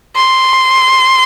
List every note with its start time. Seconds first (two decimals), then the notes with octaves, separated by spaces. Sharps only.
0.16 C6